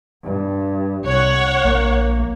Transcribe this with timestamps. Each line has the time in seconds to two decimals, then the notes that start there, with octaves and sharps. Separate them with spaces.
0.23 G2
1.05 C2 C#5 F#5
1.65 A#1 A#3